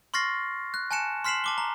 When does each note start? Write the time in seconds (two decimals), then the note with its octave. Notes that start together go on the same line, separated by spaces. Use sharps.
0.14 C6 C#6 F6 A6 A#6 C7
0.74 F#6
0.91 G#5 A5 F#6 C#7 E7
1.24 C6 F6 B6 C7 E7 F#7
1.44 A5 D6 G7
1.58 A#5